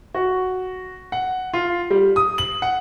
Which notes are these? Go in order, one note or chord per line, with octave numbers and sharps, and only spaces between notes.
F#4
F#5
F4
G3
D#6
F#7
F#5